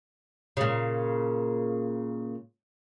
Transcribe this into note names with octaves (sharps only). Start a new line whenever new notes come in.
A#2 C#3